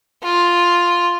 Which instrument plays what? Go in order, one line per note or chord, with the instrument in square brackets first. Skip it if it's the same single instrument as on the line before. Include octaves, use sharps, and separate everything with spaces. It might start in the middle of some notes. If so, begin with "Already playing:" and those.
[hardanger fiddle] F4